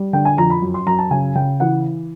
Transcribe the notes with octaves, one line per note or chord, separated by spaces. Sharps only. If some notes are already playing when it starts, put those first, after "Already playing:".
Already playing: G3
D3 G5
G#5
F2 A#5
B5
F#2
C6
F#2 A#5
A5
C#3 G#5
C#3 G5
E3 F#5